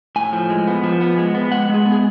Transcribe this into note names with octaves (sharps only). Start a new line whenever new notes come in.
A2 G#5
F3
G#3
B3
F3
B3
G#3
B3
G#3 F#5
G#3 G#4
B3
G#4